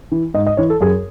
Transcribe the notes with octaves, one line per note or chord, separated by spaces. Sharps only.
E3
G#2 D#5
D#5
E3 C#5
A4
F#2 G#4